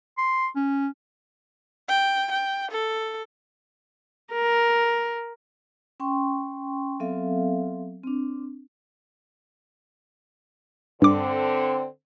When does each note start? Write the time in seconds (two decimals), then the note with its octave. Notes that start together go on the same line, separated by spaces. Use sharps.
0.17 C6
0.55 C#4
1.89 G5
2.31 G5
2.71 A4
4.32 A#4
6.00 C#4 G5 C6 C#6
7.00 F#3 B3 C4 A4 E5 F5
8.04 C4 D4
11.02 G2 D3 C4 D6